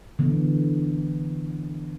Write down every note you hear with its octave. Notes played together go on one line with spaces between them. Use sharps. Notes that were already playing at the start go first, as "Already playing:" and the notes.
D3 E3 B3